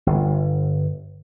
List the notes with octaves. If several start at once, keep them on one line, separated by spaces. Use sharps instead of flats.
G1